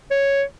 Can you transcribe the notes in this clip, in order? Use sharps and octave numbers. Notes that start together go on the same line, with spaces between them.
C#5